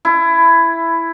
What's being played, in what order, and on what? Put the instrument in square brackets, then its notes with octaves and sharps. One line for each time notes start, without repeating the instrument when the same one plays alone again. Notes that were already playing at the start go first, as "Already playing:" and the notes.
[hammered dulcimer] E4